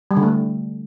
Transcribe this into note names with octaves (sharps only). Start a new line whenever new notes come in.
G3
D3
A3